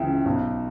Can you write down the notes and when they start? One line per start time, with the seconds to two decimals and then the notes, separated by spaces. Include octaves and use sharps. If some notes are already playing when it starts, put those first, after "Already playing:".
Already playing: C#2 C#3 E3 E5 G5
0.26 B1